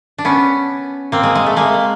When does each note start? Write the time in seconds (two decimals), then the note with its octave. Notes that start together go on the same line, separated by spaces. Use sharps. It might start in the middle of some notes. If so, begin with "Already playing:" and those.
0.18 D4
0.25 B3 C#4
1.12 A#3 C4
1.23 G#3
1.35 G#3
1.46 A3
1.57 G#3 A#3